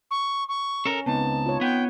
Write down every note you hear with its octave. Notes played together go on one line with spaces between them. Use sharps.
C#6
C#6
C#4 A4 A#4
C#2 B3 C4 D#4 A5
F4 C#5
B3 G5